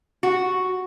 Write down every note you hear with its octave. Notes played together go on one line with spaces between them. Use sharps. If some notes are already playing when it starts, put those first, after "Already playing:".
F#4